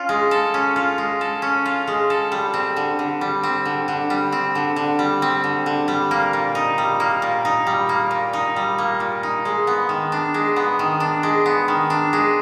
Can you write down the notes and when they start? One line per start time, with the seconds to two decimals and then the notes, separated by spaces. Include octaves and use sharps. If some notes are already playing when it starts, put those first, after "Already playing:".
Already playing: C#4 F4
0.09 G#3
0.31 A4
0.54 C#4
0.76 F4
0.98 G#3
1.21 A4
1.42 C#4
1.66 F4
1.87 G#3
2.10 A4
2.32 G3
2.54 C4
2.77 D3
2.99 D3
3.21 G3
3.43 C4
3.65 D3
3.88 D3
4.10 G3
4.32 C4
4.55 D3
4.76 D3
4.99 G3
5.22 C4
5.44 D3
5.66 D3
5.88 G3
6.11 A#3
6.33 A#2
6.55 D#4
6.78 G3
7.00 A#3
7.22 A#2
7.45 D#4
7.67 G3
7.89 A#3
8.11 A#2
8.33 D#4
8.56 G3
8.78 A#3
9.00 A#2
9.23 D#4
9.45 G#3
9.67 B3
9.89 D#3
10.12 D4
10.34 G#3
10.56 B3
10.79 D#3
11.00 D4
11.23 G#3
11.46 B3
11.68 D#3
11.90 D4
12.13 G#3